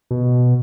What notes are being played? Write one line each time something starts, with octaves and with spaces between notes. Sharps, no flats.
B2